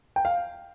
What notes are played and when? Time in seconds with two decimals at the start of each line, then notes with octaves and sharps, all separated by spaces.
0.16 G5
0.25 F5